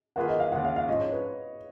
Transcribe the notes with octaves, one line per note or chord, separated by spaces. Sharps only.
D#3 A#3 F4 G#4 B4 F#5
D#5
F5
D#2 C#3 G#3 F#5
F5
F5
G#2 F3 G#3 C#4 D#5
C#5
B4